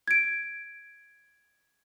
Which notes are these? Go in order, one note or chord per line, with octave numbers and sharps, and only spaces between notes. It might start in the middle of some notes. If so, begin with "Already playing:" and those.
G#6 D7